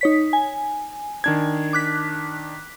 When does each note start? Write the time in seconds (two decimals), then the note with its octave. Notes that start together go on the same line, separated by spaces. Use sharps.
0.01 D#4 C#5 B6
0.33 G#5
1.24 D#3 D4 G#6
1.73 D6 F#6 B6